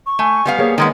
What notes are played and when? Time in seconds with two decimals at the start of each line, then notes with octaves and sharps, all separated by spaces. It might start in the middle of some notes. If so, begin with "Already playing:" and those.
0.06 C#6
0.19 A3 G#5
0.46 G3 B3 F5
0.58 A#3 G#4 C#5
0.78 D#3 G#3 B3 D#6